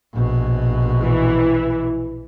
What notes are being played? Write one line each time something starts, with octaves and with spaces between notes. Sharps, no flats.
A#1 B2
E3 E4